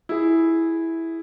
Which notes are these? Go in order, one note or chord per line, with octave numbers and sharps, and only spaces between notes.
E4 G#4